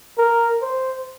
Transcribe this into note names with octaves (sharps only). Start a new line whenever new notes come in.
A#4
C5